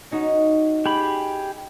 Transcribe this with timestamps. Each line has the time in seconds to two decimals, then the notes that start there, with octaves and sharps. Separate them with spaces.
0.11 C#4 D#4 F#4
0.86 G4 G#4 B5